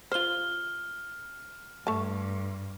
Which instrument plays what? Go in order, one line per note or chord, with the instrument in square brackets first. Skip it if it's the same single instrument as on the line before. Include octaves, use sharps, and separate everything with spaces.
[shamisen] F4 C5 [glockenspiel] F6 G7
[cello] G2 [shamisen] A3 A5